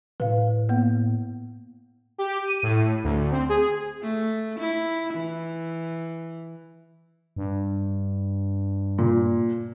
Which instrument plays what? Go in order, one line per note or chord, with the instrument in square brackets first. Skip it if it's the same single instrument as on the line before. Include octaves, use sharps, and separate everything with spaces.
[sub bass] A2 [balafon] B4 F5
[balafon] A#3 B3
[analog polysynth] G4
D#7
A2
D2
C4
G#4
[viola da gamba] A3
E4
E3
[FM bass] G2
[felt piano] A#2